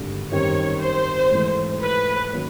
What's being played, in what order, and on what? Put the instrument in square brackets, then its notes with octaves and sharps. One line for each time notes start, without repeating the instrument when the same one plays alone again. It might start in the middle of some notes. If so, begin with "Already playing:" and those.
Already playing: [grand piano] G#1 G2 D3
[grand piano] F#2 D#3 G3 C4 [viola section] C#5
[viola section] C5
[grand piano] G#2 E3 A3
[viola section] B4
[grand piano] D#3 F#3 A#3 C#4